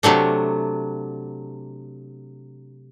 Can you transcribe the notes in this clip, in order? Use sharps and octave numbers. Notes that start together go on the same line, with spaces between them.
C3 F#3 A3 D4